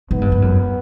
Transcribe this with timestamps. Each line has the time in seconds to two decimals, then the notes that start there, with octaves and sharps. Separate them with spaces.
0.11 G#2 B3
0.21 G2
0.32 G2
0.42 F#2